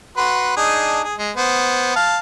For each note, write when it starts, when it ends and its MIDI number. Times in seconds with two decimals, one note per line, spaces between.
0.17 0.55 66
0.17 0.55 71
0.17 0.55 84
0.57 1.01 62
0.57 1.01 63
0.57 1.01 68
1.04 1.15 68
1.18 1.31 56
1.37 1.93 59
1.37 1.93 72
1.96 2.19 77
1.96 2.19 81